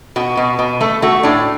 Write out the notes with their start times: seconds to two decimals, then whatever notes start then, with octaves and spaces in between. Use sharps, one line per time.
0.16 B2 F#4
0.37 B2
0.59 B2
0.81 A3 A4
1.02 A3 F#4
1.23 A2 D4